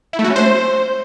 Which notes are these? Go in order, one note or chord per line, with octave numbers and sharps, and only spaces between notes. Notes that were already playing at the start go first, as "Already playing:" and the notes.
E4
A3
F#4
C#4
C5